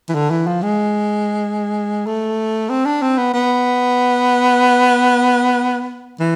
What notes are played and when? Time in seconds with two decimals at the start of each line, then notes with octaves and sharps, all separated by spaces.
0.09 E3
0.15 D3
0.30 E3
0.46 F3
0.62 G#3
2.06 A3
2.69 C4
2.85 D4
3.02 C4
3.17 B3
3.33 B3
6.20 E3